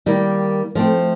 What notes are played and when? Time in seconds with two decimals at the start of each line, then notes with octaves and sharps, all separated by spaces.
0.06 D#3 G3 A#3
0.75 F3 A3 C4